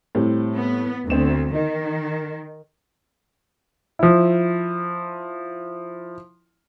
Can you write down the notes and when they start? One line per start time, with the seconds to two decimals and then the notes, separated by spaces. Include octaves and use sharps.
0.15 A2 G3 C4
0.55 B3
1.10 D2 C4 E7
1.54 D#3 D#4
3.99 F3 E4